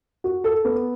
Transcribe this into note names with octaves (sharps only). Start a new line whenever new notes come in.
F#4
A4
B3